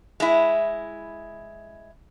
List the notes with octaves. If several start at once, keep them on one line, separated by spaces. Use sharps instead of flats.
G#3 E4